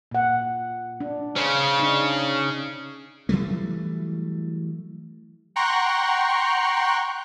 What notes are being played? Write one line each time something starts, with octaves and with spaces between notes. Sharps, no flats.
A#2 F#5
D4
C#3 C#4 C5
D4 D#4
E3 F#3 G3 A3
F#5 G5 A#5 C6 C#6 F#6